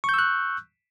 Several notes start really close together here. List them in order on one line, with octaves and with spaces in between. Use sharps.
C#6 G6 E6 F#6